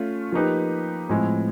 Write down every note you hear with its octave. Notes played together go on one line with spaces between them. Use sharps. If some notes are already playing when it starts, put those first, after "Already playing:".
Already playing: A3 C#4 F4
F3 A#3 D#4 G4 B4
A2 F3 G#3 C4